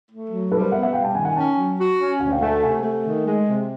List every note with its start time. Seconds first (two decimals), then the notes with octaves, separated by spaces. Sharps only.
0.09 A3
0.30 F#3
0.51 G3 A4 B4
0.61 A#4 C5
0.72 B3 E5 F#5
0.83 E5 F#5
0.93 G3 F5 G5
1.03 G5 A5
1.15 D#3 F#5 G#5
1.25 F#5 G#5
1.36 C#4 G5 A5
1.57 F#3
1.79 F#4
1.99 C#4
2.20 D2 F#5 G#5
2.31 F5 G5
2.41 A3 F#5 G#5
2.63 C3 F#5 G#5
2.83 A3
3.05 D#3
3.27 G#3
3.48 C3